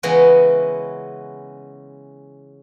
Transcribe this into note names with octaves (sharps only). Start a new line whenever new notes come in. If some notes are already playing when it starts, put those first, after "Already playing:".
C#3 E3 G#3 B3 C#4 F#4